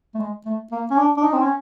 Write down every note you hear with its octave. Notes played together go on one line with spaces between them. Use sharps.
A3
G#3
A3
A#3
C#4
D4
D4
D#4
C4
C#4